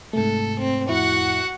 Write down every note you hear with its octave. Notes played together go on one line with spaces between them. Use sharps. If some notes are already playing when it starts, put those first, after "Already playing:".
G#2 C3 A3 A4
C4
F2 A2 E4 F#4 F#5